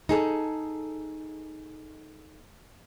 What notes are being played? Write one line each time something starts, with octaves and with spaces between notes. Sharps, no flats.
D#4 G#4 A4